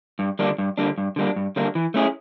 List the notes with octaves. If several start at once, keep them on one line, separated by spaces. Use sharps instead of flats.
G2
D3 G3 A#3 D4
G2
D3 G3 A#3 D4
G2
D3 G3 A#3 D4
G2
D3 G3 A#3 D4
E3
A3 C#4 E4 G#4